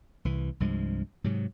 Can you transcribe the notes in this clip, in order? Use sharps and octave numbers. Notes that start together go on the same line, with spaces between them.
C2 E3
C2 G2 F3 G#3
G#2 C3 F#3